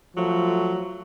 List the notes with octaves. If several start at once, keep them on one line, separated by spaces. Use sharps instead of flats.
F3 F#3 A3